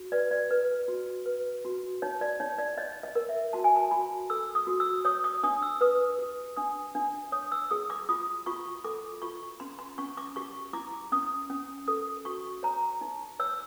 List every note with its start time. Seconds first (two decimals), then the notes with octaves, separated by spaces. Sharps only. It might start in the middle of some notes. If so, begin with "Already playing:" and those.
Already playing: F#4
0.12 B4 D5
0.31 D5
0.51 B4
0.88 F#4
1.26 B4
1.65 F#4
2.02 D#4 C#5
2.21 D5
2.40 D#4 C#5
2.58 D5
2.78 C#5 D#5
3.03 D#5
3.15 A#4
3.29 E5
3.53 F#4 A5
3.64 G#5
3.76 A5
3.91 F#4 B5
4.30 A4 E6
4.55 D#6
4.67 F#4
4.80 E6
5.05 C#5 D#6
5.24 D#6
5.43 D4 D#6
5.62 E6
5.81 B4 D#6
6.18 G4
6.56 D4 D#6
6.95 D4
7.32 C#5 D#6
7.52 E6
7.71 G#4 D#6
7.90 D6
8.09 F4 D#6
8.46 F4 C#6
8.84 A4 D6
9.22 F4 C#6
9.60 C#4 C6
9.79 C6
9.98 C#4 C#6
10.17 D6
10.36 G4 C#6
10.73 E4 D6
11.12 C#4 D#6
11.50 C#4
11.88 A4 D#6
12.25 F#4 C#6
12.63 C#5 A#5
13.01 D#4
13.39 C#5 E6